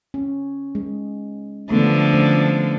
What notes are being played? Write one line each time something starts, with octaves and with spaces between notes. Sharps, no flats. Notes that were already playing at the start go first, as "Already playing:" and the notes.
C#4
G#3
D3 F3 A3 B3
A3 C#4 C5